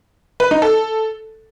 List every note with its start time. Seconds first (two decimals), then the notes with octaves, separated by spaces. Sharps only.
0.40 B4
0.51 D#4
0.62 A4